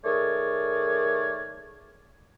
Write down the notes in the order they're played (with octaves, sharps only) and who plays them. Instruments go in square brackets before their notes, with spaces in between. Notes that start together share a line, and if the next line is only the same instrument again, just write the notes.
[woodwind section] D#3 A3 G#4 A#4 C#5 D5